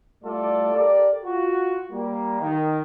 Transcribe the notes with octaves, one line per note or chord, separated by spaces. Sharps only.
G3 A3 E4 F4 A4 D5
G4 A4 A#4 D5
F4 F#4
G3 A#3
D#3